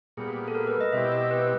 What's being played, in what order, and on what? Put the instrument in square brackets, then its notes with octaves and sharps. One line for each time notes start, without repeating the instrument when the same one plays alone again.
[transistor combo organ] A#2 G3 B3 [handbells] G#4
[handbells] A4
A#4
B4
D#5
[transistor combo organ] B2 G3 C4 E4 G4 [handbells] E5
[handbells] D#5
B4